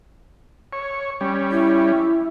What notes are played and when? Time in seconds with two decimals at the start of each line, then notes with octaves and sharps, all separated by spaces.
0.73 C#5
1.21 G3 C#4
1.51 E4